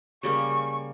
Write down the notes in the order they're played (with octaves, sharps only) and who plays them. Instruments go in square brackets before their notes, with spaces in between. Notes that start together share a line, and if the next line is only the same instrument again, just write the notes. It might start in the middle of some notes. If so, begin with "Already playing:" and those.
[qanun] C#3 G3 A#3 [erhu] C#6